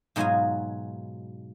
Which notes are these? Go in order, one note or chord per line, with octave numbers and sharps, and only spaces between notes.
G#2 B2 F#3 F4 G#4 G#5